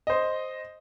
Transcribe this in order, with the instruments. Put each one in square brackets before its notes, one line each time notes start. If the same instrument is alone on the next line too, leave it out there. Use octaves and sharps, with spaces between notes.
[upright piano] C5 D#5